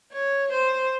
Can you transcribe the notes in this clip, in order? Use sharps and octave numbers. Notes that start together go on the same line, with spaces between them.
C#5
C5